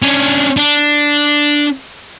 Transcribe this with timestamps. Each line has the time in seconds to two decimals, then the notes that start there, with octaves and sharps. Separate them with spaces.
0.02 C#4 D4
0.57 D4